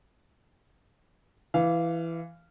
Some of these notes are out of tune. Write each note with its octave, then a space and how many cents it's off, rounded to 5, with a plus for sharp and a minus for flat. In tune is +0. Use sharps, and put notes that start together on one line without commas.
E3 +10 F5 -15